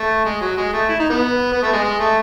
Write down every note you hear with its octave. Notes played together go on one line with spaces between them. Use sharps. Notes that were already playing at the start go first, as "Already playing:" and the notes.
Already playing: A3
G#3
F#3
G#3
A3
E4
D#4
B3
B3
A3
G#3
G#3
A3